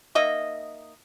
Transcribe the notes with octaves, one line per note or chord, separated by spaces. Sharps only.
A#3 D#4 D#5 E5